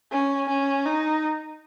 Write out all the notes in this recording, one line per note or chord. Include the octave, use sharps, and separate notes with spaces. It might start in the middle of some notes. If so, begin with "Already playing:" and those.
C#4
C#4
D#4